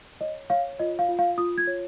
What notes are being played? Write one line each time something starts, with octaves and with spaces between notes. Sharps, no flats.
C#5 D#5
C#5 F5
F4 D#5
F5
F4
F5
F4 D#6
G#6
C#5